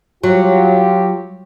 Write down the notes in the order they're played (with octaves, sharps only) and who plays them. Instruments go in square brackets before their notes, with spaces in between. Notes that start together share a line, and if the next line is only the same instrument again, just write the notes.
[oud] F#3 [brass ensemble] F4 G4